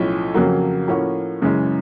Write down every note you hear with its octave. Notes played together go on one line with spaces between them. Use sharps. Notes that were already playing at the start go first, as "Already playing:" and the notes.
Already playing: B1 A2 F3 A3 C#4
F2 C#3 F#3 A#3
A2 F3 A#3 C#4 F#4
F#2 C#3 E3 G#3